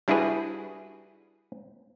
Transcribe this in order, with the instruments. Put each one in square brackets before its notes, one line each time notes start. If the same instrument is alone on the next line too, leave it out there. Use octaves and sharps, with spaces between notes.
[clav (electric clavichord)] G3 D4 E4 F#4 G#4 B4